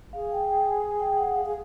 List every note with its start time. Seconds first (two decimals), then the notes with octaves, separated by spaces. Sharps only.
0.13 G#4 F5
0.32 G5
0.48 G5
0.65 G#5
0.83 G#5
1.00 G5
1.17 F#5
1.35 F5
1.46 G#4